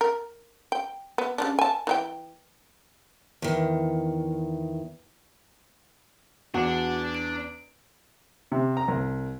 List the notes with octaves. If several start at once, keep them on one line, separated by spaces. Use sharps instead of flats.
A#4
G5
B3
C#3 G3 D4
G#5 A5
E3 D#4 G5
E2 D#3
E2 D4 F#4 D5 F#5
D7
C3
A#5
C2